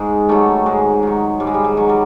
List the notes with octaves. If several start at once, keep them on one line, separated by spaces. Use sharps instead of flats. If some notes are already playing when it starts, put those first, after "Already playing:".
Already playing: G#2 D#3 G#3
D#3 F#3 G3 A3
G#2 G#3
D#3 F#3
G#2 G3
G#3
G3
G#3
D#3 F#3
G3